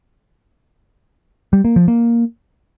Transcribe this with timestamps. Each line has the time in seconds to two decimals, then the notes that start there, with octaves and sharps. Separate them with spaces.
1.53 G3
1.65 A#3
1.76 F3
1.88 A#3